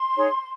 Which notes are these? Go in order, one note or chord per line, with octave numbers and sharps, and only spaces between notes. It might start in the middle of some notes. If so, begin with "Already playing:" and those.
Already playing: C6
D#4 G#4 C#5